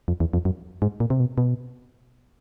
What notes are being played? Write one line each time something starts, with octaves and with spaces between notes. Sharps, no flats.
F2
E2
F2
F#2
G#2
A#2
C3
B2
B2